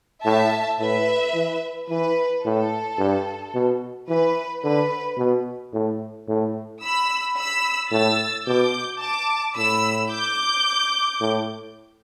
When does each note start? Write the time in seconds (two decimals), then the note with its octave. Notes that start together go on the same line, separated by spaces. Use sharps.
0.25 A2 E5 A5
0.80 A2 B4 E5
1.34 E3
1.89 E3 B4
2.44 A2 A4
2.98 G2
3.54 B2
4.09 E3 B4
4.63 D3 B4
5.17 B2
5.73 A2
6.28 A2
6.83 B5 E6
7.37 B5 E6
7.91 A2 E6 A6
8.47 B2 D6 G6
9.01 A5 D6
9.56 A2 B5 E6
10.11 D6 G6
11.21 A2